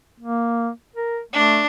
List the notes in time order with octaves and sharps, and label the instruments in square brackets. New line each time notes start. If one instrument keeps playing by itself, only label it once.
[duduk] A#3
A#4
[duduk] A3 [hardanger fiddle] D4